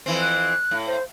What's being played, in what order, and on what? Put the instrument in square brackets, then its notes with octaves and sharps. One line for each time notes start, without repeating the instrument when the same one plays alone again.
[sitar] F2 E3 C4
[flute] F#6
[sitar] A2
[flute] C5